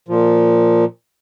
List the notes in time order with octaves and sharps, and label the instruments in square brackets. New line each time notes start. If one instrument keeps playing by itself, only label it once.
[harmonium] A#2 F3